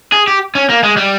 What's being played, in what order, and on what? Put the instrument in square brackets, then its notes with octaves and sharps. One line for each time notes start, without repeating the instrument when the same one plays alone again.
[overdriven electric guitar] G#4
G4
C#4
A#3
G#3
G3